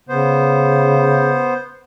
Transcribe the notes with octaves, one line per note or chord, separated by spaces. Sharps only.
C#3 B3 C5